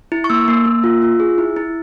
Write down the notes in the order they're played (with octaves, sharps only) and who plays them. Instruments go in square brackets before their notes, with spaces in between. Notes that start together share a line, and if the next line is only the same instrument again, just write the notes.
[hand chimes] E4
C#6
A#3 E6
A#3
A#3
F4
F4
G#4
E4
E4